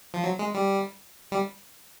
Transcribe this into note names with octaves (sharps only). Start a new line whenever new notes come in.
F3
F#3
G#3
G3
G3